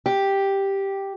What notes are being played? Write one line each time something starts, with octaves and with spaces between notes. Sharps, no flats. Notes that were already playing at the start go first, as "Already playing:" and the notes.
G4